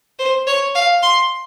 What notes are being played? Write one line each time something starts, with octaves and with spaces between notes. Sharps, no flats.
C5
C#5
F5
C6